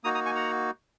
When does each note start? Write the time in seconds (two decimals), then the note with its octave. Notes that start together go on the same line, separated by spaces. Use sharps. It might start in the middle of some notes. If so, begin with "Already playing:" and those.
0.04 A#3 D#4 F#4 A#5 D#6
0.15 A#5 D#6
0.25 G#5 C#6
0.35 F#5 A#5